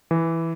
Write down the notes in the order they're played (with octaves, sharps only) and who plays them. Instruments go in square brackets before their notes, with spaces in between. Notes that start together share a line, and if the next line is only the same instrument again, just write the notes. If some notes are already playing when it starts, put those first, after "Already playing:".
[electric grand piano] E3